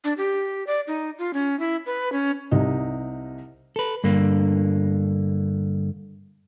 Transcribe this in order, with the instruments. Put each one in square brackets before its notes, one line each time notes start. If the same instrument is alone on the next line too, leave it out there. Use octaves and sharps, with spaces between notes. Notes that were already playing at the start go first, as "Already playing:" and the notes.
[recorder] D4
G4
D5
D#4
F4
C#4
E4
B4
C#4
[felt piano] C2 C3 D#4
[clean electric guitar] A4 B4
G2 D3 A#3